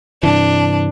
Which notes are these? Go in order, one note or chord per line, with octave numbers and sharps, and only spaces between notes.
G2 C3 E3 D4